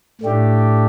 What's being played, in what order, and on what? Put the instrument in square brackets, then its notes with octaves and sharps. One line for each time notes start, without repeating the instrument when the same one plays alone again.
[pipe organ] A2 A3 D4 G4